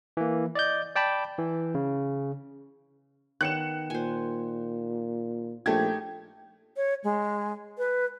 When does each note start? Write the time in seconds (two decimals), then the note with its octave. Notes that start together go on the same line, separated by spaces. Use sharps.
0.17 E3 A#3
0.55 D5 D#5 G6
0.95 D5 G5 A5 B5
1.39 E3
1.75 C#3
3.41 D#3 B3 F#6 C#7 E7
3.90 A#2 C5 G#5
5.66 A#1 A3 D#4 G4 G#6
6.77 C#5
7.04 G#3
7.78 B4